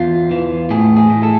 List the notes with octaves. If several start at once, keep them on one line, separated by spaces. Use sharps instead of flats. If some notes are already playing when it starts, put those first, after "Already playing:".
Already playing: E2 F4
E3
A2 G#4
G#4
A2
A4